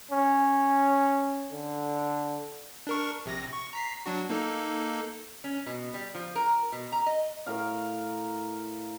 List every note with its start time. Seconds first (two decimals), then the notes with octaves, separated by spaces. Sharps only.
0.11 C#4
1.52 D3
2.87 D4 A#4 C#6
3.25 A#1 C3 A#6
3.53 C#6
3.73 A#5 B6 C7
4.06 F#3 D4 F#4
4.30 A#3 D#4 A4
5.44 C#4
5.66 B2
5.94 G3
6.15 F3
6.35 A#4
6.72 B2
6.92 A#5
7.06 D#5
7.46 A2 A#4 F5